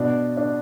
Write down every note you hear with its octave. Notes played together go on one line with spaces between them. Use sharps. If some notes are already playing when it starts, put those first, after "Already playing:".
Already playing: B2 D4
D4